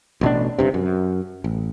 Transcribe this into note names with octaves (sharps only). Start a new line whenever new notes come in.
A1 B2 D4
G1 G2 C3
F#2
A1